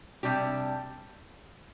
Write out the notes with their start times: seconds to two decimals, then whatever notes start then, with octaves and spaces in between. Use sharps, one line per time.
0.23 C3 G3 D4 G4